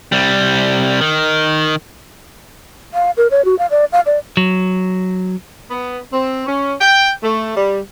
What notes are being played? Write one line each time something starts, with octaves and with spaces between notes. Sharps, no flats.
C2 G3
D#3
F5
A#4
C#5
F#4
F5
D5
F5
D5
F#3
B3
C4
C#4
G5
A3
G3